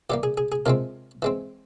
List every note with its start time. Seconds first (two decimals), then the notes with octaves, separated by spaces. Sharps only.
0.10 E3 G3 A#3 G4
0.23 G#4
0.37 G#4
0.52 G#4
0.66 C3 F3 G#3 C4 A#4
1.22 E3 G#3 C4